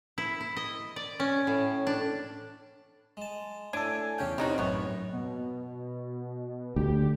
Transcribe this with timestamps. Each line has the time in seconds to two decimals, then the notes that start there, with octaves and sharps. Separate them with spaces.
0.18 E4
0.41 E4
0.56 D#5
0.96 D5
1.20 C#4
1.47 A2
1.87 D4
3.17 G#3 A5
3.73 A2 D4 A4 G#5
4.18 E2 C#3 A4 C#5 F5 G5
4.38 C3 D#3 D#4 F#4 C5 C#5
4.58 A1 F#2 B2 B3 C#5
5.13 B2
6.76 D2 G4